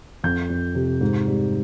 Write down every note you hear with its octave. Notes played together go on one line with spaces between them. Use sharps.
F2 G6
F2
C3
G#2
G3